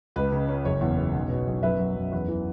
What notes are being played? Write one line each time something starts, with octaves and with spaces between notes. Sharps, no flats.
C#2 B4
C#3
C#4
F#1 C#5
E2
B3
B1
B2
B1
F#2 B4 E5
F#3
F#2
E2 B4
E3